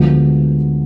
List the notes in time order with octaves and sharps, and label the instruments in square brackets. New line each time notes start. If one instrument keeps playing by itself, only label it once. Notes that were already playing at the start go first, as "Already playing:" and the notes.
Already playing: [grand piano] D2 D3 F3 G#3 B3